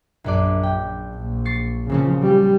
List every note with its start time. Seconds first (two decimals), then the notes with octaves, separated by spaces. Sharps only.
0.24 A#1 F#2 D5
0.63 G5
1.16 A#1
1.45 C#6 A6 C7
1.90 A#2 C#3 F3 C4 C#4
2.22 G3